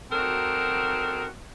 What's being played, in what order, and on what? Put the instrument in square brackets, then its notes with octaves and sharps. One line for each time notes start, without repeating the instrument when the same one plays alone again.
[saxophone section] F#3 C4 D#4 F#4 A4 A#4